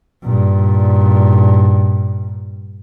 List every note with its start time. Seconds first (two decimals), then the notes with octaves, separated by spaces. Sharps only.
0.24 G2 A#2